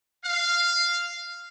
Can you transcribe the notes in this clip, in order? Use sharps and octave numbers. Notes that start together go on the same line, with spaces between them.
F5